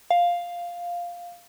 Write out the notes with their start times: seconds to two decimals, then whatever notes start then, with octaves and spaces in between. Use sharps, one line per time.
0.10 F5